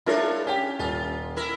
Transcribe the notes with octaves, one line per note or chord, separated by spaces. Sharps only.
G#3 D4 E4 F4 A#4 C#5
C#4 G4 G5
D#1 F4
E4 A#4